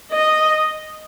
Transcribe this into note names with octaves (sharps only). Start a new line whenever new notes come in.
D#5